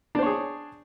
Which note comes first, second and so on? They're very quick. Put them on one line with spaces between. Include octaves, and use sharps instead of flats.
D4 C5 C#5 G#4